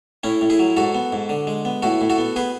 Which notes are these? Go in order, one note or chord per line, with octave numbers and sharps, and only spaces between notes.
A2 C#4 E4
A2
E4 G#4
F#3
G#2 F#4 A4
B3
G#2
D3
G#3
B3
A2 F#4 A4
A2
F#4 A4
B3
B3 G#4 B4